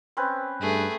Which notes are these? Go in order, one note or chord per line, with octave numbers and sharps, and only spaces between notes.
C4 C#4 B4
G2 A3 G#4